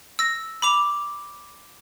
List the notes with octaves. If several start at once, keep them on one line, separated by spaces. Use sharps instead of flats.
E6 A#6
B5 D6 F7